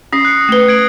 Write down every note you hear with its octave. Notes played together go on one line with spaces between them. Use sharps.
C#4 D#6 A#6 C7
F#6 C#7
A3 B4
G#6 D7 F#7